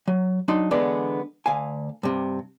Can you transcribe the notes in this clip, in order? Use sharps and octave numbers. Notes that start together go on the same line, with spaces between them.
F#3
F#3 D4 D#4 C6
D3 E3 G#3 B3 D4
D2 F5 G#5
G2 C3